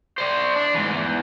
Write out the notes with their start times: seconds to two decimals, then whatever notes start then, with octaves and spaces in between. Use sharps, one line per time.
0.18 C5 D5
0.56 D4
0.74 G#2 E3
0.95 E2